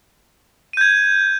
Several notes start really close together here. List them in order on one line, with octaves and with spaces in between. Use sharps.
D#7 G6 G#6